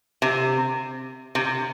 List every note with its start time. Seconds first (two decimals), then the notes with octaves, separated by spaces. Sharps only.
0.22 C3
1.35 C3